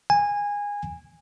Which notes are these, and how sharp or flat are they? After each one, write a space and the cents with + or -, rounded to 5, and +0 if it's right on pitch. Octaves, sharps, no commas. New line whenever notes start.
G#5 -20